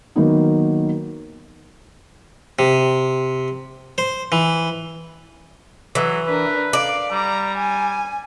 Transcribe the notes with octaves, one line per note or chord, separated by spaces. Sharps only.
D#3 F#3 A#3 B3 D#4
C3
C5
E3
E3 F#3
D4 A#4 B4
D5 F5
G3 A#5
G#5